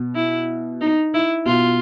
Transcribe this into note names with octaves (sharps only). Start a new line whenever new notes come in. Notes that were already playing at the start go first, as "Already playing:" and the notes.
Already playing: B2
E4
D#4
E4
B2 F4